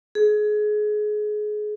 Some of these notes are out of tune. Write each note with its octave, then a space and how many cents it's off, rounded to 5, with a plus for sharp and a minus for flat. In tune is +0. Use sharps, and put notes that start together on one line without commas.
G#4 +25